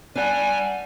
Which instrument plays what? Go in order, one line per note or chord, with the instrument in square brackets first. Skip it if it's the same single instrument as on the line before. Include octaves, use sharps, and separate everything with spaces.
[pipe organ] G3 G#5 [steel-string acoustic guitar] D4 F#5